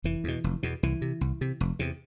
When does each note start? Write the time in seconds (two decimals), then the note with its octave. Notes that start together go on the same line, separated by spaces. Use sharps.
0.04 F1 E3
0.24 E2 B2
0.44 F1
0.63 E2 B2
0.83 C2 E3
1.02 C3
1.21 C2
1.41 C3
1.61 F1
1.79 E2 C3